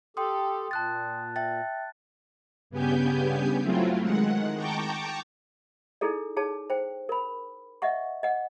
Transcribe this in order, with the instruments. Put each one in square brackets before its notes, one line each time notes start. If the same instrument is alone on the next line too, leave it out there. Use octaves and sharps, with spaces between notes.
[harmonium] G4 A4 [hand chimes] G5 C6 D#6
[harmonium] A#2 [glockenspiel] A5 F#6 A6
[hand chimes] E5 G5 [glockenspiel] A6
[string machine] G2 C#3 B3 G4 G#5 G6
F#3 A3 C4 E4 F4
D#3 G#3 F#5
G5 A5 A#5 C#6 D6 G6
[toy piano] D#4 E4 G#4 A4 D5
D#4 G#4 C#5 A5
C5 G5
A#4 B5
D#5 E5 F#5 C#6
D#5 F#5